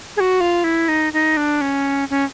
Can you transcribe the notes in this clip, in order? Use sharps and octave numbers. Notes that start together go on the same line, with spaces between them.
G#4
F#4
F4
E4
D#4
D#4
D4
C#4
C#4